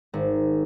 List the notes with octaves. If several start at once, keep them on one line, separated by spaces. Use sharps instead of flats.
G#1